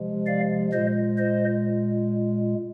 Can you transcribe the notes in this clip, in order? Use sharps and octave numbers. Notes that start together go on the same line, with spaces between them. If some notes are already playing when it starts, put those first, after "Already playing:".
Already playing: C3 F3 G#3
D5 F5
A#2 G#3 C5 D#5
C5 D#5